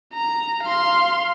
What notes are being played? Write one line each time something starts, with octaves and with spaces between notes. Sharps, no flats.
A#5
F5 C6